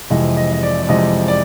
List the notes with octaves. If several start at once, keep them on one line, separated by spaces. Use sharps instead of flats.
F1 F2 C3 E3 G#3 D#5
D#5
D#5
D5
D5
F1 F2 C3 E3 G#3 D#5
D5